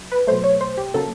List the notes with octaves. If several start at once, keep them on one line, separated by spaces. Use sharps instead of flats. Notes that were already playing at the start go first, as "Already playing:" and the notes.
Already playing: F#3
B4
B2 F#3 A3 C5
C#5
C5
G4
C#3 F#3 A#3 A4